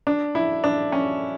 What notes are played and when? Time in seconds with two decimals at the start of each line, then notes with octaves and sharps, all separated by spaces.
0.07 D4
0.35 E4
0.64 D4
0.92 C#4